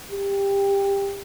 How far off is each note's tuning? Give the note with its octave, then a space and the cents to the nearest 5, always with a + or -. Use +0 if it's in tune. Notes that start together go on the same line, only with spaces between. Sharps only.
G4 +15